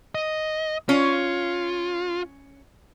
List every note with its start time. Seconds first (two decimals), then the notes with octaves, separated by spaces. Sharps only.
0.15 D#5
0.89 C#4 F4